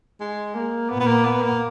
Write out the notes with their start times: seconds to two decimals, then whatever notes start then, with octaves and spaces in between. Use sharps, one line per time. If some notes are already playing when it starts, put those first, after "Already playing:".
0.20 G#3
0.55 A#3
0.89 A#2 B3
1.00 B3
1.07 A#3
1.25 B3
1.42 A#3